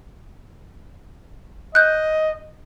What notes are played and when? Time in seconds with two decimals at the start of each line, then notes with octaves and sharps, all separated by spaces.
1.75 D#5 F#6 G6